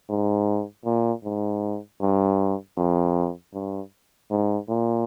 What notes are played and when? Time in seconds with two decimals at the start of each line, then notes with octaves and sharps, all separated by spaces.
0.09 G#2
0.85 A#2
1.24 G#2
2.01 G2
2.77 F2
3.54 G2
4.31 G#2
4.68 A#2